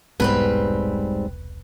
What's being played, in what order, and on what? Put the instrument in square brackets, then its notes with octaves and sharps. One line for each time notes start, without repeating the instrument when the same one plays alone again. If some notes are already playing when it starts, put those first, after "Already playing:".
[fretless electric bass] E1 C2 B3 [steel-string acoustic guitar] G#2 G3 C4 [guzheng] B4